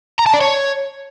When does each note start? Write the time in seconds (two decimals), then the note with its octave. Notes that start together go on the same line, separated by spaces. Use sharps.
0.19 A#5
0.26 A5
0.34 D5
0.41 C#5